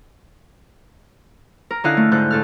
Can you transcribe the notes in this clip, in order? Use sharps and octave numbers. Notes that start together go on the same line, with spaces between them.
A#4
D3 C#4 E4 D#5 F5 F#6
A3
G#2 D3 F#6 G6
A2 A4 F6